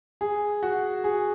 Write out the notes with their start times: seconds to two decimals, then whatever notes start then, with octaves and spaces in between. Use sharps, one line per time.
0.21 G#4
0.63 F#4
1.04 G#4